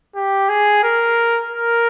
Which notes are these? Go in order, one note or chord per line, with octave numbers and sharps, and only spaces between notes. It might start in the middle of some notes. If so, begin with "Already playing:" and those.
G4
G#4
A#4
A#4